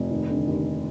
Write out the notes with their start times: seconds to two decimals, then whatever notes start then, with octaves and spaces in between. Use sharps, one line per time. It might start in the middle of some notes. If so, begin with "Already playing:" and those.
Already playing: F1
0.11 D#2
0.29 D3
0.47 D#2